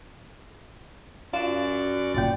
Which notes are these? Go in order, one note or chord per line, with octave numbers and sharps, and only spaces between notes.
F#2 F4 D5 E7
G1 A#2 D5 G5